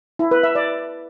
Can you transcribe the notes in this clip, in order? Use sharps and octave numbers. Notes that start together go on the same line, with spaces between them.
E4
B4
E5
D5